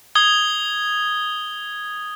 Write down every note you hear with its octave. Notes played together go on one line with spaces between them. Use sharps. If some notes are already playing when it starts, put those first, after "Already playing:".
D#6 G#6 G7